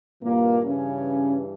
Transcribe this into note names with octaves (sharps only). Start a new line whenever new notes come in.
G2 A#2 E3 A#3
C#3 C#4